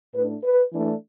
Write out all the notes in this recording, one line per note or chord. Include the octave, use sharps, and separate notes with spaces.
A2 A3 D4 B4
B4
E3 A3 D4